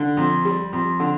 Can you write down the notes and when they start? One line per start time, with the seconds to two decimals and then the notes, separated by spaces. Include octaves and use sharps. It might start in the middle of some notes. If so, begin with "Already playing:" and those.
Already playing: D3
0.17 F2
0.45 G3
0.73 F2
1.00 D3